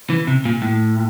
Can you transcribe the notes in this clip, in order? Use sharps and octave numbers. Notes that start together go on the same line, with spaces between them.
E3
C3
A#2
A2